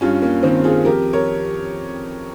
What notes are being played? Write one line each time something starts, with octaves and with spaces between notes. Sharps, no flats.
G2 C#4 F4
A#3 C#4
D#3 C4
F4 G#4
F2 G4 A#4
A#4 C#5